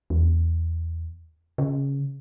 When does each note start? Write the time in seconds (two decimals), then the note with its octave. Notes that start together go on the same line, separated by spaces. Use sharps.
0.10 E2
1.58 C#3